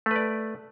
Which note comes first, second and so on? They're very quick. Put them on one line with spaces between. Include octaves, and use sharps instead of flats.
A3 B4 D5